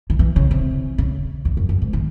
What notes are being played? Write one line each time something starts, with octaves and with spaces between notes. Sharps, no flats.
D#3
E3
C#3
C3
C#3
E2
F#2
F#2
G#2
D#3